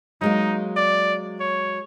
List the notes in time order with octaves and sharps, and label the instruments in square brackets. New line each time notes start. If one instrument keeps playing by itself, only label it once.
[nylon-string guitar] F#3 G#3 A#3 [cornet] D#4
[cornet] D5
C#5